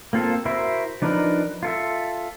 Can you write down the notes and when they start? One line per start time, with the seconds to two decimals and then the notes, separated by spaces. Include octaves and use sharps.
0.13 A#3 C4 F4 A4
0.45 E4 F#4 A#4 C5 E5
1.02 F3 D4 D#4 A#4 B4
1.63 F4 A4 E5